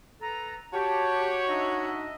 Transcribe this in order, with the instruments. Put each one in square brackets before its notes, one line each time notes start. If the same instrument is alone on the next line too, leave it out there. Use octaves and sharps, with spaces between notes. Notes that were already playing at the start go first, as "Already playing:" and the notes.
[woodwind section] A4 B4 A#5
[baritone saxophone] F#4 [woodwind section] G4 [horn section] C#5 [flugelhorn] A5
[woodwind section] D4 D#5 E5 [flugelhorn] D#4